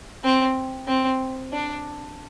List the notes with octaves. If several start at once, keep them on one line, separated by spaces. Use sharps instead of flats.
C4
C4
D4